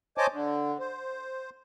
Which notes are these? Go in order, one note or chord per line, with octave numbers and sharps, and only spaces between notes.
C5 C#5 D#5 G#5 A5 D6
D3
C5